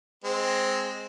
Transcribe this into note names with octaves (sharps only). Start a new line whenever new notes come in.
G#3 C4